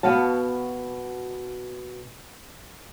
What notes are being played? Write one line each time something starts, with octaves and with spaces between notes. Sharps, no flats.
B2 B3 F#4 F5 A5